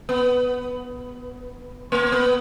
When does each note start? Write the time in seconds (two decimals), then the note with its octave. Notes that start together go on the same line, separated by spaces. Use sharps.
0.09 B3
1.92 A#3
2.12 B3